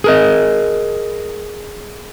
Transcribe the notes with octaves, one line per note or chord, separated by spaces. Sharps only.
G#4 A#4 D#5